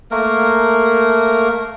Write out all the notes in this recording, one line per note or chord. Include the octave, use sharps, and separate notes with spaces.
A3 A#3 A#4